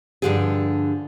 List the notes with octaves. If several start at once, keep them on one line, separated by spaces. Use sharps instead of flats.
G2 A#2 D3 F3 G4 G#4